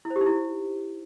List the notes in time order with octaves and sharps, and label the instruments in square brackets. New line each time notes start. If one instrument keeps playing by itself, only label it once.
[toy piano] E4
C5
G4
D#4
E4